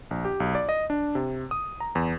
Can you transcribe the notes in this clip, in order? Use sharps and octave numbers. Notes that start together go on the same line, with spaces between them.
A#1
G4
B1
D5
D#5
D4
C3
D#6
A#5
E2